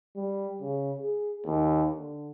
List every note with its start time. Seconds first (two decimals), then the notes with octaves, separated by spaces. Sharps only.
0.16 G3
0.62 C#3
0.99 G#4
1.46 D#2
1.95 D3